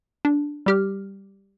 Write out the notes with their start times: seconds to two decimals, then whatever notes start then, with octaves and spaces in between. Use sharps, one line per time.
0.25 D4
0.66 G3 G4 F6